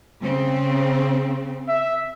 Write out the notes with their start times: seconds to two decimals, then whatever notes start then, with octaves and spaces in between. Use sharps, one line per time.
0.23 C#3 C4
1.68 E5